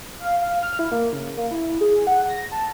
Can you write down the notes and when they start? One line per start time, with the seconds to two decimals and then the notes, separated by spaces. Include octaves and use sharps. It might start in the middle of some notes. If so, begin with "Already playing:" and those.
0.20 F5
0.41 F5
0.63 F6
0.79 E4
0.92 A#3
1.13 C#3
1.37 A#3
1.51 E4
1.81 G#4
2.07 F#5
2.29 A#6
2.52 A5